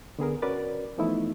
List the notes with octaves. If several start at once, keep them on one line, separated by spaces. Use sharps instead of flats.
D3 B3 G#4 A#4
C#4 F#4 A#4 B4 D5 A6
E3 F3 A3 B3 D#4 E4